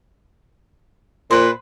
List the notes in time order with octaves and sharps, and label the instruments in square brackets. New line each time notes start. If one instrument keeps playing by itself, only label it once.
[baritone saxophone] A#2 [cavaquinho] B4 C5